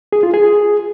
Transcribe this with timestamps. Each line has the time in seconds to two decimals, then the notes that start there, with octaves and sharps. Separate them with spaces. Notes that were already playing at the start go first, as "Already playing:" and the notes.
0.13 G#4
0.23 F4
0.34 G#4